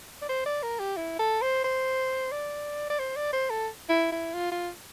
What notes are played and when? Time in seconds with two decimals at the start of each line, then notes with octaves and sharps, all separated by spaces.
0.22 D5
0.29 C5
0.46 D5
0.63 A#4
0.79 G4
0.97 E4
1.19 A4
1.42 C5
1.64 C5
2.32 D5
2.90 D5
2.99 C5
3.16 D5
3.33 C5
3.50 A4
3.89 E4
4.12 E4
4.34 F4
4.52 F4